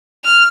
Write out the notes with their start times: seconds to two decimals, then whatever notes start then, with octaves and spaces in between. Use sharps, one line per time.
0.24 F6